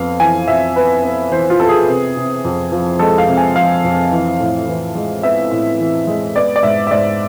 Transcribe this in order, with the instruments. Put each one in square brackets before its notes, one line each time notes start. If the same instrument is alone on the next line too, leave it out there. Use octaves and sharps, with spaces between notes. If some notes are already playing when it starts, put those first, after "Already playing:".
Already playing: [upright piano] F2 B3 F5
E3 G#5
F2 E5
B3 B4
B3
E3 C5
F4
B3 A4
G#4
C3
C3
F2
F3
G#3 A4
F5
C3
G#5
F3 F5
F2
E3
A2
E3
G#3
B3 E5
A2
E3
G#3
B3 D5
D5
G#2 E5
E5
G#2 D5